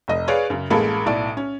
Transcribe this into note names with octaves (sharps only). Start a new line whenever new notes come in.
F1 D#5
G#4 B4 C#5 D5 F5
F#2 C#3
A1 G#3 A#3 A4 B5
B1 A2 D5 A5
C#4